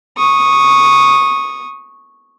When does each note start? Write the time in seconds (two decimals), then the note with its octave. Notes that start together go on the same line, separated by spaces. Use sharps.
0.17 C#6 D#6